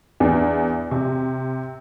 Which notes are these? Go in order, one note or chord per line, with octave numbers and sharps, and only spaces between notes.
E2 D4
C3